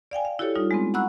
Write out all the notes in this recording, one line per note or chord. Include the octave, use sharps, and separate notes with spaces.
D5 F5 G5 G#5
F5
E4 F#4 G4 A4 C#5
G3 D#4 F4
G#3 B3 C4
F#5 A#5 B5 C#6 E6 F#6